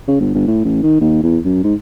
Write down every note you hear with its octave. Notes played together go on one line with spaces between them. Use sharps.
C#3
G1
G1
A2
A1
D#3
D#2
E2
F#2
G#2